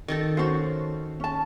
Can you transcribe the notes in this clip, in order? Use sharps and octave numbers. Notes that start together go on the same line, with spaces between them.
D#3 D#4 A4
C#4 F#4 A4 C5
C#4 A5